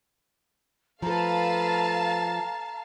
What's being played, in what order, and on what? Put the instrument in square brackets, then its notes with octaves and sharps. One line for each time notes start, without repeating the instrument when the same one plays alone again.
[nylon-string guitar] F3 A4 [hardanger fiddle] A3 B4 [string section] F5 A5 [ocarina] A#5